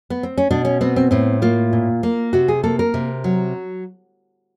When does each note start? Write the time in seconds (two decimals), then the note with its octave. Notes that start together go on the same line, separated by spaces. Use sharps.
0.10 B3
0.23 C4
0.38 C#4
0.51 B2 D4
0.65 C#4
0.81 B3 C4
0.96 C4
1.11 A2 C4
1.42 A#3 F4
1.73 A#2
2.03 A#3
2.33 C3 F#4
2.48 G#4
2.63 A#3 A4
2.79 A#4
2.94 C3
3.24 F#3